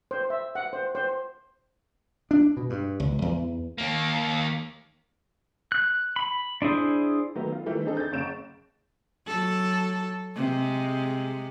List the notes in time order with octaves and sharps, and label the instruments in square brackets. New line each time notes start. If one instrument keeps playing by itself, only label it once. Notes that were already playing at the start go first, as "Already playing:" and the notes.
[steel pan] C5
E5
F#5
C5
C5
[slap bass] D4
B2
G2
C#2
E2
[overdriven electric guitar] D#2 A#3
[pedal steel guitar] F#6
B5
D4 E4 G#4 C5
[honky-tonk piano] D#3 F#3 A3 B3
F4
D#3 E3 G3 A3
C4 D4 D#4 G#4 A4
G6 A6
F#1 C#3 C#5 D7 E7
[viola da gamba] F#3 A4
C3 G#3